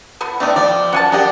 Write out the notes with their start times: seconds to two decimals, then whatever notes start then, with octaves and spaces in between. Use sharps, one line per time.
0.21 D3 B3
0.40 A2 A3 B3 D4 D#4
0.56 F3 D5
0.93 F#2 F#5 G#5 A5
1.12 A#3 D4 G4 G#4 F#5